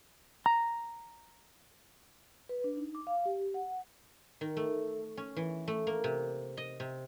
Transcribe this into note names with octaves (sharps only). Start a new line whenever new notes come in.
A#5
B4
D4
D#4
D6
F5
G4
F#5
D#3
A3
C#4
E3
A3
A#3
C3
D#5
C3